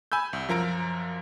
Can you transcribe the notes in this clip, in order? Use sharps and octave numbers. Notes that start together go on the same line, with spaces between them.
G#5 B5 E6 G6
C2
F#2 F3 A#4 A#5 D7